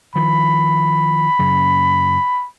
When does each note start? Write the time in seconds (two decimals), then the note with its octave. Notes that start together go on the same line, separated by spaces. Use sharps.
0.16 D#3 F3 B5
1.39 F#2 C#3